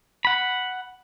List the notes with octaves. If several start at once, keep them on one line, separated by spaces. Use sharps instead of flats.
F#5 B5